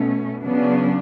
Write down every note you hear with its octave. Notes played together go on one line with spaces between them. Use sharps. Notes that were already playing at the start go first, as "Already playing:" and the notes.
Already playing: B2 A3 C#4
C#3 F#3 B3 D4